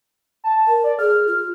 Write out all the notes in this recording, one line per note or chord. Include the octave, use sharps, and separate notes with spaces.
A5
A#4
D5
G#4 F6
F4